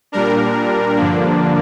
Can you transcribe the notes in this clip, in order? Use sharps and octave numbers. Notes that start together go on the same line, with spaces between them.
A#2 G3 D4 A#4
G2 D3 F3 A#3 D4